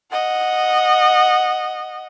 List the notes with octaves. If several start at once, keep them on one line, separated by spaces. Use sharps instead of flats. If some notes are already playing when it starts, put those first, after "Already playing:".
D#5 F#5